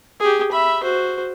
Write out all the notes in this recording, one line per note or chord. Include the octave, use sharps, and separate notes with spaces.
G4 G#4
E5 B5
F#4 C5